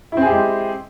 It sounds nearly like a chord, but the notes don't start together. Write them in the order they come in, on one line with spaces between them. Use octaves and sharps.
E4 C4 G#4 G4 G#3